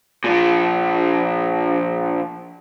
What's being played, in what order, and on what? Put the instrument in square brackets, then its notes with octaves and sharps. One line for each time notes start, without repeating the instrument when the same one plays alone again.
[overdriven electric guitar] A#2 F3